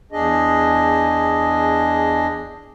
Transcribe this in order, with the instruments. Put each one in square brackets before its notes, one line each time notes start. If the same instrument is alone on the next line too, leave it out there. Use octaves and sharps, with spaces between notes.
[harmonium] E2 D4 G#4 D#5